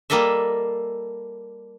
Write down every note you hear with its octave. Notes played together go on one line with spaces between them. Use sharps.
G3 A#3 A4 D#5 E5